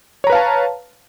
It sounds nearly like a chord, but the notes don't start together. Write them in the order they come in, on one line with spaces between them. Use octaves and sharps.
C#5 A#5 B4 F5 A5